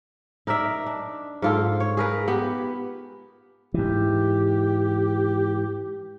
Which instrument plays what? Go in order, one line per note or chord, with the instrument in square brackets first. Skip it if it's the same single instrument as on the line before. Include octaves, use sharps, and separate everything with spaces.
[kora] D#4 A#4 D5 E5
D4
G#2 F4 A4
C#5
G#4 A#4 B4
B3 G4
[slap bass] G#2 E3 [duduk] G4